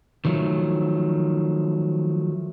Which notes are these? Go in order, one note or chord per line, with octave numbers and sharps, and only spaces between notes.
D#3 F3 F#3 A3